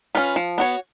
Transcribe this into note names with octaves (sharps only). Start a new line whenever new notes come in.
C#4 F4 B4
F3
B3 F#4 C#5